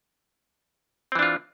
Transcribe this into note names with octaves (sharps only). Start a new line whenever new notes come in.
E3 C4 D4 F4